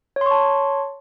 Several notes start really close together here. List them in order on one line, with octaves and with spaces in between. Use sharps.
C#5 C6 C#6 A5